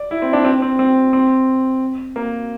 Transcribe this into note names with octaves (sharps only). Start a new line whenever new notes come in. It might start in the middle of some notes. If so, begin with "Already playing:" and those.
Already playing: D5
E4
C4
D4
C4
C4
C4
C4
A#3